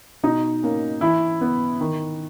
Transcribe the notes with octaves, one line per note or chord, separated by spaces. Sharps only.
B2 D#4
A#3 C#4
E3 E4
B3
D#3